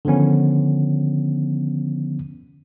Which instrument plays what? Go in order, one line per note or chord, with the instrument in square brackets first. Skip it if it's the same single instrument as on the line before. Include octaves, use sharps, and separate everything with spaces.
[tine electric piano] D3 D#3 F3 B3 C#4